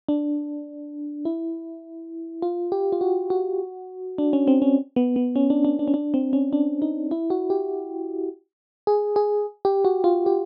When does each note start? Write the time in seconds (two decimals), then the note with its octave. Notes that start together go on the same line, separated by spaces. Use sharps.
0.09 D4
1.25 E4
2.42 F4
2.72 G4
2.92 F4
3.01 F#4
3.30 F#4
4.18 D4
4.33 C#4
4.48 C4
4.62 C#4
4.96 B3
5.16 B3
5.36 C#4
5.50 D4
5.65 D4
5.79 D4
5.88 C#4
5.94 D4
6.14 C4
6.33 C#4
6.53 D4
6.82 D#4
7.11 E4
7.30 F#4
7.50 G4
8.87 G#4
9.16 G#4
9.65 G4
9.85 F#4
10.04 F4
10.26 G4